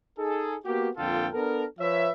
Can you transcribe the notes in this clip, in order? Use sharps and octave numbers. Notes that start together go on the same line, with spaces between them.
D#4 G#4 A4
A#3 B3 F#4 G4
F2 A#2 D3 F4 A4 G5
B3 D4 A4 A#4
F3 B4 C#5 E5